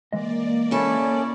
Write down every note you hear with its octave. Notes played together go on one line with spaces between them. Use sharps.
E3 G#3 A#3 D5 D#5
C#3 C#4 E4 A4